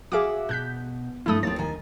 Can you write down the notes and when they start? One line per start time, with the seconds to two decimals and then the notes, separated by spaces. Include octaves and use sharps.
0.12 F#4 G#4 E5 F5 D6
0.49 B2 F#6 G6 B6
1.26 G2 A3 E4 D#6
1.43 D#2 C4 C#5 A6
1.59 D#3 G#5